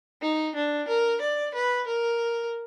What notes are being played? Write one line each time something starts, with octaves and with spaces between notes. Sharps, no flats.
D#4
D4
A#4
D5
B4
A#4